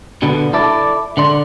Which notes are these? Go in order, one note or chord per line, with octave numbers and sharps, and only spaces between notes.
B2 D3 B3
E4 A4 D5
D3 D5 C6